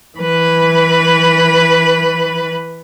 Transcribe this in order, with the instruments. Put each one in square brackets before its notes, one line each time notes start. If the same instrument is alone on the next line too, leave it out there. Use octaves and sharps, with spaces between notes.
[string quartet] E3 B4 B5